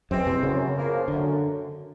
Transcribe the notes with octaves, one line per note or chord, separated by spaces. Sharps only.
F#2 E3 G#3 C4
C3
F#2 C#3
C#3 F3 A#3
F#2 D3